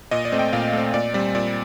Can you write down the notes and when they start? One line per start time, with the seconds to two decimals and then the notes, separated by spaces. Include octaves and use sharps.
0.11 A#2 D#5
0.25 D5
0.32 A3 C4
0.39 G5
0.53 A#2 F5
0.73 A3 C4
0.94 A#2 D5
1.14 G3 C4 D5
1.35 A#2 D5